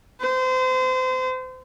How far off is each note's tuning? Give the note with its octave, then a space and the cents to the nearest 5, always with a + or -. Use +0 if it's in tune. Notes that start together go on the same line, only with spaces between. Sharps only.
C5 -30